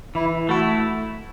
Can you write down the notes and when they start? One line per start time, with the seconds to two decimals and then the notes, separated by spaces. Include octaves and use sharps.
0.15 E3 E4
0.49 A3 E4 F#4